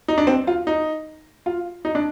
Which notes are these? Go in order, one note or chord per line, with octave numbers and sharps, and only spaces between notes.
D#4
D4
C4
F4
D#4
F4
D#4
D4